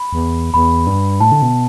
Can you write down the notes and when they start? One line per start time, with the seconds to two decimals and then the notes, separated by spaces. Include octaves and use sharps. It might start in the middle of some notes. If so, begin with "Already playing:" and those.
Already playing: B5
0.13 E2
0.54 E2 B5
0.87 G2
1.20 A2 A5
1.32 D3
1.42 B2